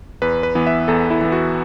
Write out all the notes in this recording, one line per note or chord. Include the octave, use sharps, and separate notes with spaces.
E2 B4
B4
E3 B3
E5
E2 A4
E4
E3 B3
F#4